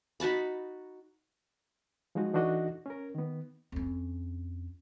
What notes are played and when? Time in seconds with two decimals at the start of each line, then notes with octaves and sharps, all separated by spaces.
0.20 D#4 F#4 A5 B5
2.15 F3 G#3 D#4 F#4
2.34 E3 D4 D#4 F#4 A4 D#5
2.86 C#4 A#4
3.15 D#3 B3
3.72 F2 C#4